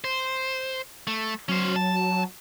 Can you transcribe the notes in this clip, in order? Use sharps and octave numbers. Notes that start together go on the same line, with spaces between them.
C5
A3
F#3 C#4 C5
A5